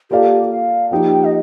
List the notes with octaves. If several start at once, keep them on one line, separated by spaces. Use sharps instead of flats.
A#3 F4 G4 A4 D5 F5
F5
F3 A#3 D#4 G4 G5
D#5